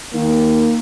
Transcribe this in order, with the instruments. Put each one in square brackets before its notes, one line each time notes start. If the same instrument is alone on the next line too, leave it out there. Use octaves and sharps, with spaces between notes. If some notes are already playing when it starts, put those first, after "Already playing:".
[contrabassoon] D#3 [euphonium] A#3